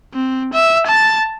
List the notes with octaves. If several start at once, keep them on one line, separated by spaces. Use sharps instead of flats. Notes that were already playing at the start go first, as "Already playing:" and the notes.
C4
E5
A5 A6